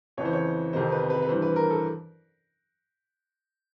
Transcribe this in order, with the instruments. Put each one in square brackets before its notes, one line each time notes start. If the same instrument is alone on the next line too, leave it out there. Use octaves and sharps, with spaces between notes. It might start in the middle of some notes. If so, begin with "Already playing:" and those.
[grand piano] F2 C#3 E3 C#5
C5
C#5
F2 C3 D#3 C5
B4
B4
B4
G2 E3 C5
B4
A#4
A4